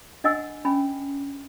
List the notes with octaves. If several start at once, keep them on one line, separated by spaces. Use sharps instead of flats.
D4 D#5 F#5 G#5 E6
C#4 G#5 B5